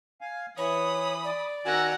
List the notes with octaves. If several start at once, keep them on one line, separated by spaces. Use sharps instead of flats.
F5 G#5
E3 C#5 B5 D#6
D5
D#3 F#4 F#5 G#5 A#5 E6